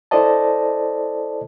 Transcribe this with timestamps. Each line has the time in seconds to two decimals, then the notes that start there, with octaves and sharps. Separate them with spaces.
0.11 E4 A4 C5 D5 D#5 A5